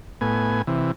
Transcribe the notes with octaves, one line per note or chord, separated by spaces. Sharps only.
A2 B3 G#5
C3 E3